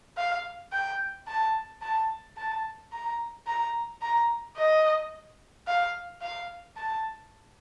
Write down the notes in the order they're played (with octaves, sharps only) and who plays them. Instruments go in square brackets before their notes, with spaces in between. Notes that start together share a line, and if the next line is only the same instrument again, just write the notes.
[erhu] F5
G5
A5
A5
A5
A#5
A#5
A#5
D#5
F5
F5
A5